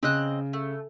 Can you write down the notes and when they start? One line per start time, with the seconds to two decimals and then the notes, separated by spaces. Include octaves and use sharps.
0.03 C#3 C4 D#5 F#6
0.53 A3